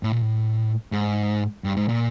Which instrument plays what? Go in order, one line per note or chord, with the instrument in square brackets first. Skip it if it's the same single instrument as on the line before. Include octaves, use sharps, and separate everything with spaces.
[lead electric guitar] A2
A#2
A2
G#2
G2
G#2
A#2